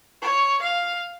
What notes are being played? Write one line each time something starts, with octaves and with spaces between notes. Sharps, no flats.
C#5
F5